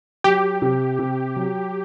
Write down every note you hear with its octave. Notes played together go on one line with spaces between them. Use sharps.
F#3 G4
C3
C3
F#3